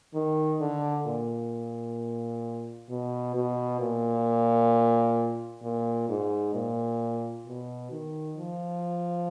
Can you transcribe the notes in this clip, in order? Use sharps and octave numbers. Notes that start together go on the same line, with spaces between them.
D#3
D3
A#2
B2
B2
A#2
A#2
G#2
A#2
B2
D#3
F3